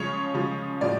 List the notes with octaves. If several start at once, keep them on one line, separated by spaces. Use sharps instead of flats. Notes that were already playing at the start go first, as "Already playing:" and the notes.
Already playing: C#3 F3 G#3 C#5
C#3 F3 G#3
A2 F3 G#3 D5